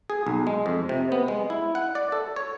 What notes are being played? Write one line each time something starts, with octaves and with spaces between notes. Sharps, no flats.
G#4
B1
G#3
F2
C3
B3
G#3
E4
F#5
D5
A4
C#5